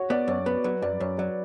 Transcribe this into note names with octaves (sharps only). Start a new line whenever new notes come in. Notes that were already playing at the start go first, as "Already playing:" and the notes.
Already playing: F#4 C#5
B3 D5
F#2 C#5
B3 B4
F#3 B4
F#2 D5
F#2 C#5
F#3 D5